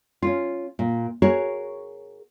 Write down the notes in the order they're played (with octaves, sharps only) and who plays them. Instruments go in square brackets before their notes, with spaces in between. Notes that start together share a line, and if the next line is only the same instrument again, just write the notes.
[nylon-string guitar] C#4 F4
A#2
F#4 G#4 A#4 C#5